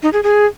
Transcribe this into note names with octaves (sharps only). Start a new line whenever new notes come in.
D#4
G#4
G#4